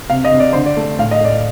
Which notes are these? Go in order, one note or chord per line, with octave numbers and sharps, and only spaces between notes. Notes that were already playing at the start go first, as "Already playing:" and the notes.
C3 F5
D#5
C3
D5
D3 C5
D5
A3
A2 F5
D#5
A2 D5